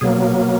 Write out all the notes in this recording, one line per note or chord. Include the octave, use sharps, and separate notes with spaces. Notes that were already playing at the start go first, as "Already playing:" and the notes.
B2 F#3 A#3 G#4